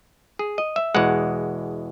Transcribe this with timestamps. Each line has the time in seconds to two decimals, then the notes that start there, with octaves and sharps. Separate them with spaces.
0.39 G#4
0.58 D#5
0.76 E5
0.95 E2 B2 G#3 F#5